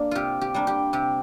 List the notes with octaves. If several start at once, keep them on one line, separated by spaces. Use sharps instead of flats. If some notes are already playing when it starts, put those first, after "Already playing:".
Already playing: A#3 D4
C3 F4 G4
G4
G3 A#3 D4
G4
C3 G4